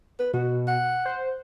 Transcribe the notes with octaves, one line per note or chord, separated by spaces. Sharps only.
B4
B2 F#4
F#5
C5